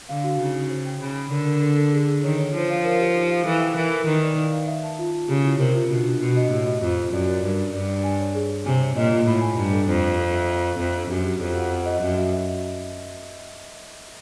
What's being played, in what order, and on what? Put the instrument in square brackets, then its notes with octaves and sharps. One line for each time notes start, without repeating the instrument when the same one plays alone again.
[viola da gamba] D3 [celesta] F5
[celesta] F#4
[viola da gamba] C#3 [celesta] D#4
[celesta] D#4
C5
G5
[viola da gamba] C#3 [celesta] B5
[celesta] B5
[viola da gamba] D3 [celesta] A#4
[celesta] A#4
A4
A4
G#4
G#4
[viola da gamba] D#3 [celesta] C#5
[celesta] C#5
[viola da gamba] F3 [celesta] C5
[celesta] F5
A#4
G4
D#4
F5
[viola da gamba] E3 [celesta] A4
[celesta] G5
[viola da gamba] E3 [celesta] A#4
[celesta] A#4
[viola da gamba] D#3 [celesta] B4
[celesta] D5
F5
F5
E5
A5
F4
F4
[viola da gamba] C#3 [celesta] G4
[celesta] E4
[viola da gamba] C3 [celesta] A#4
[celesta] F4
[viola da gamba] B2 [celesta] D4
[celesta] D4
[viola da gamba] B2 [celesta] F#4
[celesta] D#5
[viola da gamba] A2 [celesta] G4
[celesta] D#5
[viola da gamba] F2 [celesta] F4
[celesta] F4
[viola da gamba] F#2 [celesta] D5
[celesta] A#4
[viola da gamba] G2 [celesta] A#4
[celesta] D5
[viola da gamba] G2 [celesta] D5
[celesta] D5
G#5
C#5
G#4
G#4
[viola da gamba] C3 [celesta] G#5
[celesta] C#5
[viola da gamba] A#2 [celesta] D#5
[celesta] F4
[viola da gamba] A2 [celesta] B5
[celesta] G#5
[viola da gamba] G2 [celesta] A#5
[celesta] A4
[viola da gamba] F2 [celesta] C5
[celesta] C5
A4
E5
A#5
A#5
[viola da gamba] F2 [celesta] E5
[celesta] D4
[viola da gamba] F#2 [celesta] G4
[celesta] G4
[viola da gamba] F2 [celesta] A4
[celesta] F#5
F#5
D#5
[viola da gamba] F#2 [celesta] E5
[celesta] E5